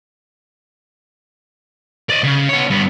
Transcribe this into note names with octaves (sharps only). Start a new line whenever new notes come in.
D5 D#5
C#3
B3 C#5
G2 B3